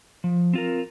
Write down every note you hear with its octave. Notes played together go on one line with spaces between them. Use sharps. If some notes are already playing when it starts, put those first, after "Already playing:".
F3
C4 F4 A#4